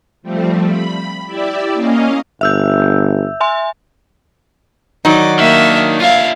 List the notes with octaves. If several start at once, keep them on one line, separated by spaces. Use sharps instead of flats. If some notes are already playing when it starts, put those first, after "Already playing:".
F3 G3 A3 C4
B5
E4 G4 D5 E5
A#3 C#4 D#5 F5
G1 E5 E6 G6
E5 G#5 C6
D#3 F#3 D#4 D5
D#3 A#3 D4 C#5 E5
F4 E5 F5